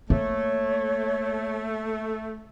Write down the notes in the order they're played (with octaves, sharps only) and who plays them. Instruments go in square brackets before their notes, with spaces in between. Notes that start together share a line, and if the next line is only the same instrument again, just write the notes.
[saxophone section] A3 [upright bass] A#3 [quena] C#5